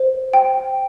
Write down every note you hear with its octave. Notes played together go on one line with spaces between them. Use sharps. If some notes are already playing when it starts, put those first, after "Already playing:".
Already playing: C5
G5